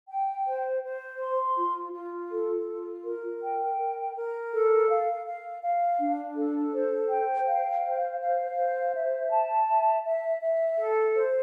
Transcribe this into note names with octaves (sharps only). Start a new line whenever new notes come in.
G5
C5
C5
C6
F4
F4
A4
F4
A#4
G5
A#4
A#4
A4
F5
F5
F5
D4
A4
C5
G5
F5
C5
F5
C5
E5
A5
E5
E5
E5
A4
C5